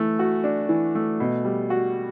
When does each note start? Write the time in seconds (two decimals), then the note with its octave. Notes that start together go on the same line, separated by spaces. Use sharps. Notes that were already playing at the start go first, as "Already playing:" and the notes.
Already playing: E3 A3
0.19 F#4
0.44 D4
0.69 E3
0.95 A3
1.20 B2
1.45 G3
1.70 F#4